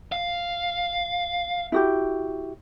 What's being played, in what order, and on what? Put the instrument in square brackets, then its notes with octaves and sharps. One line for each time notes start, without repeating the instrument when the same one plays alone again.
[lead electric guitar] F5
[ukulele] E4 F#4 G4